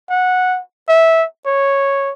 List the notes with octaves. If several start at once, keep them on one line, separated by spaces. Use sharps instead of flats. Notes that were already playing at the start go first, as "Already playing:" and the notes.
F#5
E5
C#5